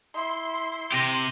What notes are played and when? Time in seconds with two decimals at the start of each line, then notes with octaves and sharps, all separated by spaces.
0.14 E4 C6
0.92 C3 G4 A#6 D#7